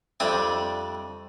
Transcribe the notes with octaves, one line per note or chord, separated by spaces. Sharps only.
F2 G3 D4 E5 D#6